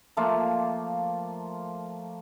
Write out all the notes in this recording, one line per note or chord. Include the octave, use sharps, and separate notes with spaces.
F3 A3 A#3 F4